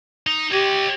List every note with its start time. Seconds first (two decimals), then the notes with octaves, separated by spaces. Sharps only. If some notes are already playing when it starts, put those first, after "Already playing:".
0.27 D#4
0.52 G4 C#5 D#5